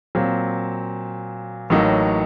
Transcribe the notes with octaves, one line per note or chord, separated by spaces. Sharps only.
A#2 F#3 C4
A1 A2 F#3 A#3 D#4